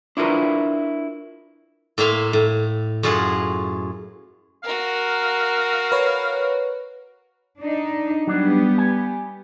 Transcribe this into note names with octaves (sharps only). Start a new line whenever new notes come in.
D4 E4 F4 A#4 B4
A2 A#3 E5 F5 C6
A2
F#2 A2 F4 G#4 F#5
F#4 A#4 F5
B4 C#5
D4 D#4
F#3 G3 B3 D4 G4
G#5